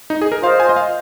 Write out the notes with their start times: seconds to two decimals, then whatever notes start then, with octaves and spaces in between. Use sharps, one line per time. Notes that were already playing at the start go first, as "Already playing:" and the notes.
0.10 D#4
0.22 G#4
0.32 A#4
0.43 F4 C5 D#5 F5
0.60 G#5
0.69 D#5
0.76 F5